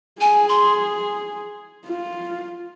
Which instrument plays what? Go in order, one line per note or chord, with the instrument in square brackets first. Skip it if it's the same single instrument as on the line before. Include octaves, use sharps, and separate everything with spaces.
[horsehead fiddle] G#4 [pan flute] G#5
[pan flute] C6
[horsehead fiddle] F4